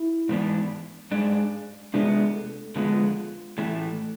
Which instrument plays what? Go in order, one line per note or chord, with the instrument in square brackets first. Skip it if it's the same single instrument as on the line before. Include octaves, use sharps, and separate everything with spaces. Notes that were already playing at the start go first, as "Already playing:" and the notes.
Already playing: [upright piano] E4
[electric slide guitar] G#2 E3 B3 D4
G#2 G#3 D4
[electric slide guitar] C3 G#3 B3 [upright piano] D4
[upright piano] A3
[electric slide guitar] F2 D3 G#3 B3 [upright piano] F4
[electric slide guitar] A2 E3 A3